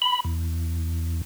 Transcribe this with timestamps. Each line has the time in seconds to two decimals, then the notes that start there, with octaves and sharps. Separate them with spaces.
0.02 B5
0.25 E2